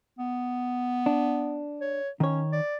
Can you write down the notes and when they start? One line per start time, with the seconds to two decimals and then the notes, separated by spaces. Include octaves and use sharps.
0.18 B3
1.06 D4
1.81 C#5
2.20 D#3 C#4 C#5
2.52 D5